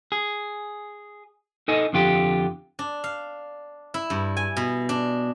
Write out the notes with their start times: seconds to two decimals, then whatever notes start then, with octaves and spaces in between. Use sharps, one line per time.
0.12 G#4
1.68 D#4 A4 D#5 G#5
1.93 F2 D3 F4 G4
2.79 D4
3.04 F5
3.94 E4
4.10 G2
4.37 G#5
4.57 B2
4.89 D4